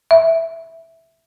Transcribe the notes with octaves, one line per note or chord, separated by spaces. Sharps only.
E5